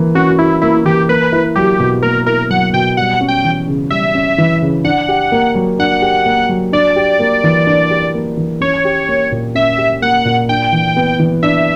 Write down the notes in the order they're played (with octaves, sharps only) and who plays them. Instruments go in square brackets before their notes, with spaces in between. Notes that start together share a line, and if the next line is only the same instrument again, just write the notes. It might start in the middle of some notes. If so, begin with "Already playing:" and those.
Already playing: [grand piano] E3 A#3
[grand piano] C#4 [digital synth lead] F#4
[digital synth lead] E4 [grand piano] F#4
[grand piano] A#3 [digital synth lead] E4
[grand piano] E3 [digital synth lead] G4
[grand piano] A#3 [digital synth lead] B4
[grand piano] E4
[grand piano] F#3 [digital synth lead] G4
[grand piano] B2
[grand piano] A#3 [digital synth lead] A#4
[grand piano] E4 [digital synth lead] A#4
[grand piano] F#3 [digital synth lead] F#5
[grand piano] B2 [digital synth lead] G5
[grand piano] G3 [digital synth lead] F#5
[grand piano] C#4
[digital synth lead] G5
[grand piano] E3
C#3
[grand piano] G3 [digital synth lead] E5
[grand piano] C#4
E3
C#3
[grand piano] D4 [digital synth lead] F#5
[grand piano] G4
A#3
F#3
[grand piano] D4 [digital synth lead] F#5
[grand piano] G4
A#3
F#3
[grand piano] D4 [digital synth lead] D5
[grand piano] G4
A#3
E3
D4
G4
A#3
E3
[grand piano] C#4 [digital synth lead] C#5
[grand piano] G4
A#3
A#2
[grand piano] C#4 [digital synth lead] E5
[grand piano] G4
[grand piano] A#3 [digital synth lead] F#5
[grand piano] A#2
[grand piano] D4 [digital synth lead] G5
[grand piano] E3
B3
E3
[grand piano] D4 [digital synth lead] E5